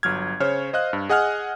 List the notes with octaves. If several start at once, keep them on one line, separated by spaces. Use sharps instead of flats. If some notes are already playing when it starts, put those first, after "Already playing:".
G1 F#3 F6 G#6
C#3 C5 C#5 F6
C5 D#5 F5 F#6
G2
G#4 D#5 F#5 G#5 F6 F#6